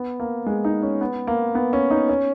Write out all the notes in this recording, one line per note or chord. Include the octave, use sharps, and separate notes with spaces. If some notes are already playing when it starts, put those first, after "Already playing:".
Already playing: B3
A#3
G#3
D#4
C#4
B3
A#3
B3
C#4
D#4
C#4